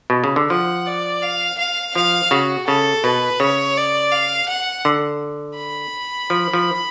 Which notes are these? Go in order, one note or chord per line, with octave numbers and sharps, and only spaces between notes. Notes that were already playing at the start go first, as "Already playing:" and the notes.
B2
C#3
D3
F3 F#5
D5
F5
F5
F3 F5
C#3 F#4
C#3 A4
B2 B4
C#3 C#5
D5
F5
F#5
D3
B5
F3
F3